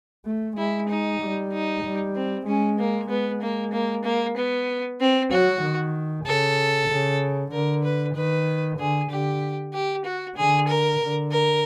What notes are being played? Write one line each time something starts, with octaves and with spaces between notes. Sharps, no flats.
A3
G#3 E4
D#4
G3
D#4
G3
C4
G#3 C#4
A#3
G#3 B3
A#3
A#3
A#3
B3
C4
F#3 F#4
D#3
C#3 A4
C#3
D3 A#4
B4
D#3 B4
D3 G#4
D3 G4
G4
F#4
D3 G#4
A#4
D3
A#4